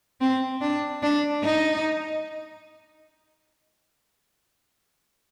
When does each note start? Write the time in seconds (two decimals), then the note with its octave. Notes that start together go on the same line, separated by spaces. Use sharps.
0.21 C4
0.61 D4
1.03 D4
1.44 D#4